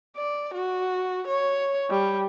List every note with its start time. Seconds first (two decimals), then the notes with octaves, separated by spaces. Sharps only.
0.17 D5
0.54 F#4
1.27 C#5
1.90 G3